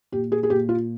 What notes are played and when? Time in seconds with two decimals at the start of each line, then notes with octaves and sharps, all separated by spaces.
0.12 A#2 G4
0.32 G#4
0.43 G#4
0.50 A#2 G4
0.69 F4